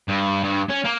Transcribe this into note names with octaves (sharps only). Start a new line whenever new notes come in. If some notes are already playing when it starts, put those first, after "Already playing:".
G2
G2
C#4
A#3